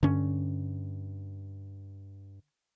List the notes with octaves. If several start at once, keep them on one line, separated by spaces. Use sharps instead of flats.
G2 D3 C#4